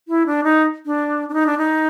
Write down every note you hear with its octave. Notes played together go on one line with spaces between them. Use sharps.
E4
D4
D#4
D4
D4
D#4
D4
D#4